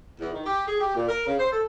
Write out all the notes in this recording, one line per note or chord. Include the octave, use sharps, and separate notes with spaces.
E2
D#3
G4
G#4
G4
A#2
A#4
C#3
C5
A4